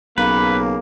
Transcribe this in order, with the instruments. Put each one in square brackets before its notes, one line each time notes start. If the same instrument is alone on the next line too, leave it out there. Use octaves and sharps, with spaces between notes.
[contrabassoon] B1 [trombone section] C#3 A#3 [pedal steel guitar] B4